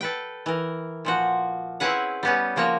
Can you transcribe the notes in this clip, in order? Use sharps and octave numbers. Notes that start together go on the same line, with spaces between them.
A4 B4 G5
E3 A#4
A#2 F3 F#4
C4 C#4 E4 G#4 B4 F#5
G3 B3 C#4
C#3 F3 A#3 F#4 C#5